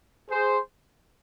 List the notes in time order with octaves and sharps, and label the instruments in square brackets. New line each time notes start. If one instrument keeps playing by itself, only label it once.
[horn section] G#4 C5